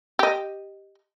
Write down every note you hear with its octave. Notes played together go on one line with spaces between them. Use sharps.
G4 D#5